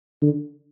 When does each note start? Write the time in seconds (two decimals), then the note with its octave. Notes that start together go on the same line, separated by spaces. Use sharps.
0.22 D3